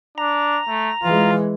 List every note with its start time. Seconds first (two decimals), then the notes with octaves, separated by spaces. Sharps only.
0.18 D4 A#5
0.68 A3
1.03 E3 G#3 F4